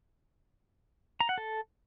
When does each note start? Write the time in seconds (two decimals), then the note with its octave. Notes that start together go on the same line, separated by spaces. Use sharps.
1.20 A#5
1.29 F#5
1.38 A4